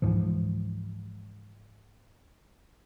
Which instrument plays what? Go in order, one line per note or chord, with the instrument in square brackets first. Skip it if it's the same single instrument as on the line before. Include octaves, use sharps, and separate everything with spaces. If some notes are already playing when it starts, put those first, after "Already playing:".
[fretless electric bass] C#2 G#2 E3 F3